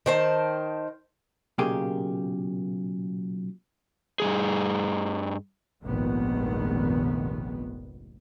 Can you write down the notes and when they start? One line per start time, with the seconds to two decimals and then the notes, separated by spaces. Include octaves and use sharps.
0.06 D#3 C5 A5
1.58 B1 A#2 C#3 A#3 G4 G#4
4.20 G2 F3 G#4
5.84 F1 A#1 G#2 D#3 B3